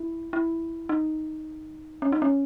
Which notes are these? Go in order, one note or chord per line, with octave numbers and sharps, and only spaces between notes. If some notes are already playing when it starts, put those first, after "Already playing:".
Already playing: E4
E4
D#4
C#4
D#4
C#4